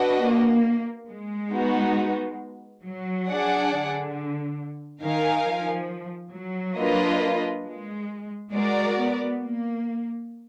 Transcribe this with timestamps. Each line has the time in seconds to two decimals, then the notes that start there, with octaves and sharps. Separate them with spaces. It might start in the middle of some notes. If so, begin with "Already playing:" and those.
Already playing: D4 F#4 B4 D#5
0.20 A#3
1.08 G#3
1.52 B3 D#4 F#4
2.84 F#3
3.27 D4 G#4 D5 F#5
3.71 D3
5.03 D#3 D#4 A#4 F5 G#5
5.46 F3
6.34 F#3
6.78 A#3 D4 F4 B4 D#5
7.66 G#3
8.53 G#3 F#4 A#4 D5
8.97 B3
9.42 A#3